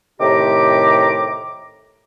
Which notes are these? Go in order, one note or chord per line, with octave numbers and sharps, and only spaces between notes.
A2 C3 D#3 G4 A#5 D6